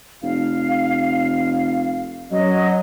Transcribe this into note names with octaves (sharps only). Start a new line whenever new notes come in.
F1 F5
F#2 F#3 D#5